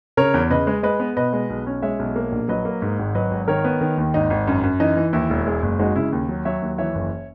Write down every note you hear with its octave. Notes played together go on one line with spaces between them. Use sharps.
C#3 A#4 C#5
E2
C#3 B4 D#5
G#3
G#3 B4 D#5
B3
B2 B4 D#5
G#3
B1
C#4
G#3 C#5 E5
B1
A#3
A#1
F#3 B4 D#5
A#3
G#2
G#1
F#3 B4 D#5
G#1
D#3 A#4 C#5
B3
D#3
D#2
G#1 D#4
G#1
F#2
F#2
E3 D#4
E3
D#2 E4
E1
G#3
F#1
G#3 D#4 F#4
C#3 E4
D#2
F#3
F#3 C#5 E5
D#2
E3 C#5 E5
F#1